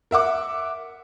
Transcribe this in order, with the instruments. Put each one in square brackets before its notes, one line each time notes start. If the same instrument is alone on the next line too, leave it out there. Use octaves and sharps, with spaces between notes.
[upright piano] A#4 E5 F#5 D6